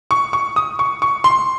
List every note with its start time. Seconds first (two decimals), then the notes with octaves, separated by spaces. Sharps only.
0.11 C#6
0.33 C#6
0.56 D#6
0.79 C#6
1.02 C#6
1.24 C6